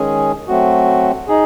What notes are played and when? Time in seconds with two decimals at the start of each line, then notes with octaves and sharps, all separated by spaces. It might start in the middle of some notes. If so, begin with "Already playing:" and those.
Already playing: D#3 G#3 C#4 G#4
0.48 F#3 A3 C4 F#4
1.28 D#4 G#4